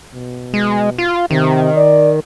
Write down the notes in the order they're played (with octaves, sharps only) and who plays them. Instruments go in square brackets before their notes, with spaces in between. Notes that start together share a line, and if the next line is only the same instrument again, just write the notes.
[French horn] B2
[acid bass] G#3
F4
[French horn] C3 [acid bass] D#3
[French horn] D5